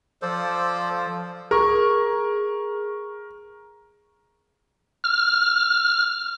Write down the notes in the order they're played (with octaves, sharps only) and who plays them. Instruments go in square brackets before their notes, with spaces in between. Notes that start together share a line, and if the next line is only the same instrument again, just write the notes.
[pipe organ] F3 [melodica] A4 C5 D5
[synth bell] G#4 C#6 [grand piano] A#4
[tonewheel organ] F6